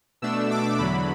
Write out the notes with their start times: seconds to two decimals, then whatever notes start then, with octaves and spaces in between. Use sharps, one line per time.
0.22 B2 A3 D4 E6
0.51 D6
0.79 E2 D3 F#3 B5